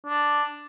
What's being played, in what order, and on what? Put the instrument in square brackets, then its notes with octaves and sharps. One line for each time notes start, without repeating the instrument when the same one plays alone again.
[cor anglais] D4